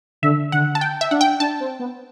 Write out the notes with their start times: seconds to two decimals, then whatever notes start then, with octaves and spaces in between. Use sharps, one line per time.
0.22 D3 E5
0.52 D3 F#5
0.75 A5
0.81 G5
1.01 E5
1.11 D4 F#5
1.21 G5
1.40 D4 A5
1.60 C4
1.79 B3